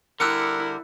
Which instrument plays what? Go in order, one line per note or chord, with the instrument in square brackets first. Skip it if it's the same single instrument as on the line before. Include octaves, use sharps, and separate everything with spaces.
[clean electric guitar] D3 G3 [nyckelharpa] E4 [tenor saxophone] A#4 [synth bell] E6 F#6 C#7